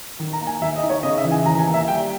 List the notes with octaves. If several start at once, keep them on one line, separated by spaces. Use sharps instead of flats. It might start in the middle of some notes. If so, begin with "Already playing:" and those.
D#3
A#5
A#3
G#5
D#2 E5
D#5
D#4
C#5
C#3 D#5
E5
E3
G#5
D#2 A#5
G#5
A#3
E5
G3 G5